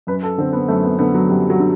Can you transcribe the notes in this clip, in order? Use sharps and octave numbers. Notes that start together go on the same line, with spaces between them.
F#2 B4
A4
D3 C4
B3
F#2 A3
B3
D3 B3
F#3
F#2 G3
F#3
D3